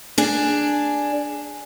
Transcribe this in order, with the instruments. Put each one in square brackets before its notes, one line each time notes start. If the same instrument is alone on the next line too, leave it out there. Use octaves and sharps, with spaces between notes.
[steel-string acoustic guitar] D4 G#4